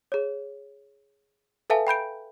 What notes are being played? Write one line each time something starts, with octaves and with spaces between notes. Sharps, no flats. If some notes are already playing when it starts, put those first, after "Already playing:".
G#4 C#5
A4 B4 E5 F5 G#5 A5
G5 B5 G6 D7